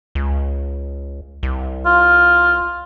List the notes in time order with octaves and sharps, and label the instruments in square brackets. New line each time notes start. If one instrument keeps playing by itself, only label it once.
[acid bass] C#2
C2
[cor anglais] F4